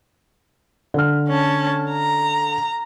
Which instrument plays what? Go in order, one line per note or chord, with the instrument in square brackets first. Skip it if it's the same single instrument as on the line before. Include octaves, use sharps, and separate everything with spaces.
[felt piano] D3 F6
[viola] C#4 A5
A#5